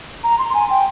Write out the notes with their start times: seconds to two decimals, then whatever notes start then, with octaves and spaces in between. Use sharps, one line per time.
0.24 A#5
0.39 C6
0.54 G#5
0.70 G5